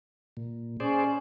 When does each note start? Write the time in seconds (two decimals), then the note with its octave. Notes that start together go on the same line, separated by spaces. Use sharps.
0.37 A#2
0.80 C#4 G#4 C5 D5